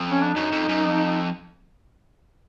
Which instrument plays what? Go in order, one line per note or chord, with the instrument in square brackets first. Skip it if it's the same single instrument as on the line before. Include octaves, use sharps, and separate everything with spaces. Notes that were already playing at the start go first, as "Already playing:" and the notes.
Already playing: [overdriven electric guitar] F2
[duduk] C#4
D4
[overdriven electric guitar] F#2 [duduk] D#4
[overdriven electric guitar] F2
F#2
F2